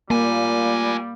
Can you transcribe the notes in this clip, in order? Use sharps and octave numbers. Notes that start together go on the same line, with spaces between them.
A#2 G3 A3 A#3 G#5